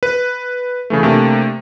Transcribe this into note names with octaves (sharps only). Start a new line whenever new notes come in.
B4
C#3 E3 A3
C3 A3 A#3 D4